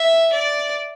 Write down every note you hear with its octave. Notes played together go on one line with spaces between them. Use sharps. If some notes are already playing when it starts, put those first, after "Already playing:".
Already playing: E5
D5